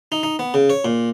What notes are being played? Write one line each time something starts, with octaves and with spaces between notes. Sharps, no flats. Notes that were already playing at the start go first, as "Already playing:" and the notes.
D#4
D#4
B3
C#3
C#5
A#2